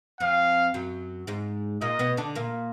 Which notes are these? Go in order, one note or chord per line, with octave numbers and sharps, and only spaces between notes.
F2 F3 F5
F#2 F#3
G#2 G#3
A#2 A#3 D#5
B2 B3
D3 D4
A#2 A#3